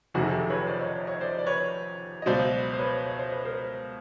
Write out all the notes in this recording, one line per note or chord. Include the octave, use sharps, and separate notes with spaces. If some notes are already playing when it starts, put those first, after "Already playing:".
F1 F2 C3 D#3 F#3 F#4 G#4
G4 A4
B4 C#5
C5 D5
C#5 D#5
C#5 D#5
C5 D5
D5
B4 C#5
D#5
C#2 B2 F#3 C5 D5
C5
B4 C#5
C#5
C5
B4
A#4 C5